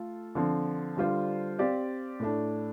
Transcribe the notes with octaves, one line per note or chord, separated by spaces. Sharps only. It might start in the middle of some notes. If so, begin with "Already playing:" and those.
Already playing: A3 F4 A4
D3 F3 C4
D3 G3 F4 C5
C4 G4 D5 F5
A2 A3 D4